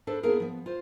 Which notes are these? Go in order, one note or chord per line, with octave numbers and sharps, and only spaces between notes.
D4 A4 B4 C5
A#3 B3 D4 E4 G#4 A#4
F3 B3
F4 C5